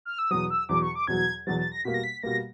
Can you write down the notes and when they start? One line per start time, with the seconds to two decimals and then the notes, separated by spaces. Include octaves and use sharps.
0.05 F6
0.19 E6
0.31 E2 B2 F#3 D#6
0.50 E6
0.69 E2 B2 F#3 D6
0.82 C#6
0.95 D6
1.07 E2 B2 F#3 G#6
1.47 E2 B2 F#3 A6
1.59 A6
1.72 A#6
1.85 B2 G3 A#3 B6
1.94 A#6
2.04 B6
2.23 B2 G3 A#3 A#6